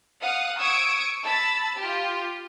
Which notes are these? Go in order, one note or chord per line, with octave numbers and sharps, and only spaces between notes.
F5 F#5 D#6
C#6 D#6 E6 G#6 D7
A5 B5 E6 A6
F4 G4